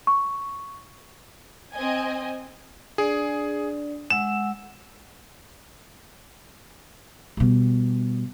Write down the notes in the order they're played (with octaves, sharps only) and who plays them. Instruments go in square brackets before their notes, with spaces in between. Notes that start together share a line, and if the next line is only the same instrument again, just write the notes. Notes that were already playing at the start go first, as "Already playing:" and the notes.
[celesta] C#6
[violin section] C4 D#5 G#5
[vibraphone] D4 D5 [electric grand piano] G#4
[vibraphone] G#3 F#5 E6 [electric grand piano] E7
[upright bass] B2 G3